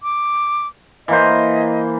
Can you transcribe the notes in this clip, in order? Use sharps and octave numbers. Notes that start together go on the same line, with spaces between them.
D6
E3 A#3 C5 D#5